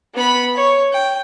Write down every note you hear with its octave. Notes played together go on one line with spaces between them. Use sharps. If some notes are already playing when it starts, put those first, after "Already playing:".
B3 B5
C#5
G5